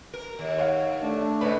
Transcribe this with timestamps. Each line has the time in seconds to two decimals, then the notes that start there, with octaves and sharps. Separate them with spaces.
0.14 A#4
0.39 D#2
0.58 C#5 F5 F#5
1.02 A3 D4
1.41 G#2 C#3 B4 B5